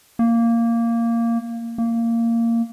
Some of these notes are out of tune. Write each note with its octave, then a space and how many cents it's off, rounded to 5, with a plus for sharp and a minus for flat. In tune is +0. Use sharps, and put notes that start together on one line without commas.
A#3 -10
A#3 -15